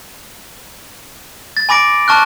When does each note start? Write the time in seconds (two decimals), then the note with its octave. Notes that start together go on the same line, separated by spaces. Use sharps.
1.57 A6
1.69 G#5 B5 D6 A#6 D7
2.08 A5 C#6 F6 F#6